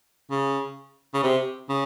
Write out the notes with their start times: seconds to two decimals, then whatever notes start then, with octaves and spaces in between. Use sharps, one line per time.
0.30 C#3
1.14 C#3
1.23 C3
1.69 C#3